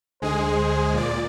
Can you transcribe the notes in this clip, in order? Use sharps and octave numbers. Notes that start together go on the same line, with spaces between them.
D2 D3 G#3 G#4 C5
A#2 D5